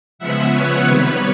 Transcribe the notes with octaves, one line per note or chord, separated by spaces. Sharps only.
C#3 F3 G#3 B3 E5 F#5
B4 C#5
C3 D#3 G3 B3